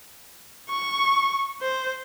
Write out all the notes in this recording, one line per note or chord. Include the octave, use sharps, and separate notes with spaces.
C#6
C5